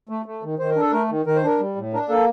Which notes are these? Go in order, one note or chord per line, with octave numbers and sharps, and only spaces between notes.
A3
A3
D#3
D#3 C5
A#4
D4 A4
A3 A#4
D#3
D#3 A#4
C5
D4 A#4
G3
A2
D4 A#4
A#3 A4